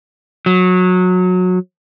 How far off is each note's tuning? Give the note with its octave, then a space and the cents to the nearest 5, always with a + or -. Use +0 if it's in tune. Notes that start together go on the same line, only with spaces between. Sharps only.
F#3 -20